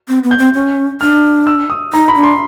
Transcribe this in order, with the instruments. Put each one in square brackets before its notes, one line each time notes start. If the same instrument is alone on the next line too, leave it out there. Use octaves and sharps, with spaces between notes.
[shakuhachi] C4
B3
[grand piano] G6
[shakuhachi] C4
C#4
[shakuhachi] D4 [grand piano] F6
[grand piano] E6
D#6
[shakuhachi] D#4 [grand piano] A#5
[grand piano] B5
[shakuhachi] D4
[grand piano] C6